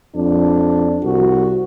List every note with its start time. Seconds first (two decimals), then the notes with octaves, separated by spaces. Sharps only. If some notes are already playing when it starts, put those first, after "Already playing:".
0.15 F2 D4
1.04 C2 F#4